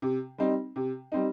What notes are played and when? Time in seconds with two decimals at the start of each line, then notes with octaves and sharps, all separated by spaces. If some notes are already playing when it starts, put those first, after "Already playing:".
0.02 C3
0.38 G3 C4 D#4
0.76 C3
1.12 G3 C4 D#4